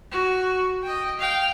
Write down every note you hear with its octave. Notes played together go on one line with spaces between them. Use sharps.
F#4
D#5 G5
F5 G5